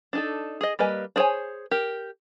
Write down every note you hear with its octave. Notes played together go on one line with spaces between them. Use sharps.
D4 D#4 A4
G#4 D#5
G3 A#3 B4 D#5 G#5
D4 G#4 C5 C#5 G#5
G4 A#4